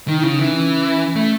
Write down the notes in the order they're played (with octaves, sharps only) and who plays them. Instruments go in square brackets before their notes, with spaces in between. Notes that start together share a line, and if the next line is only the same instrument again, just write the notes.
[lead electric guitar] D#3 [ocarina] D#4
[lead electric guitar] C#3 [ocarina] E4
[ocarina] D#4
[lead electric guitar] E3 [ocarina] C#4
[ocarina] C#4
[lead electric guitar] A3